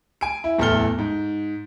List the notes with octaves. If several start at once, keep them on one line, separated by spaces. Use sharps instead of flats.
G#5 D7
E4
D1 E2 A3 A4 F6 G7
G#2